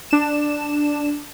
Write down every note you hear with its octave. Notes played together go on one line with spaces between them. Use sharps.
D4 E7